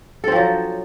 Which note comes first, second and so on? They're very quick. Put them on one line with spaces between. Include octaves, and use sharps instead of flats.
A4 C4 F3 F#3